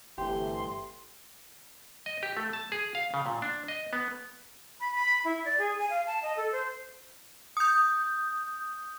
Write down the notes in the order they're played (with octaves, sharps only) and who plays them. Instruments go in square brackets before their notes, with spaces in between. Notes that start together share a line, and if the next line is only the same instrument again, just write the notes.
[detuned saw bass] G1 [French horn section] C3 E3 A3 [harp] G4 [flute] C6
[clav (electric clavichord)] D#5
G4
A3
A5
G#4
F5
C#3
A#2
D4
D#5
B3
[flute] B5
B5
E4
D5
G#4
G#5
F5
A5
D#5
A4
C5
[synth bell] D#6 G6